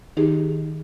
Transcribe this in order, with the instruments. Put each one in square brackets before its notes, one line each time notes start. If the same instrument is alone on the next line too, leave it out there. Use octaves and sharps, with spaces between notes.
[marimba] D#3 D#4 G4 G#4